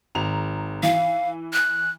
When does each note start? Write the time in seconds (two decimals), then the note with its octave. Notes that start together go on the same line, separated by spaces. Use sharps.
0.15 G#1 A#5 F7
0.83 E3 F5
1.53 F#6